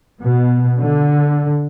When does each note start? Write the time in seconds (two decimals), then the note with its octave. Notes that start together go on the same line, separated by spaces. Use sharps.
0.21 B2
0.79 D3